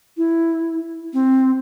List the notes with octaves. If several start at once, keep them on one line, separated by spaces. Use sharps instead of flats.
E4
C4